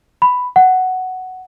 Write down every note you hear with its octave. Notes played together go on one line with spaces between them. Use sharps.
B5
F#5